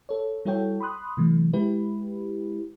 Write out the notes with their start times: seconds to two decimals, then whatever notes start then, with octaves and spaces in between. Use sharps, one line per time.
0.09 A4 C#5
0.45 G3 E4 F#4 A4 C#5 G5
0.80 B5 C6 D#6 F#6
1.17 C3 E3 F#3 A3
1.53 G#3 E4 G4 B4